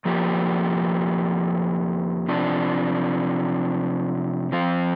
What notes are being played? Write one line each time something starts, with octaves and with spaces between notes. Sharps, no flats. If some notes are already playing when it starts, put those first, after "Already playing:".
F2 F3 A#3 G4
C3 F3 D4
F3 C4 F4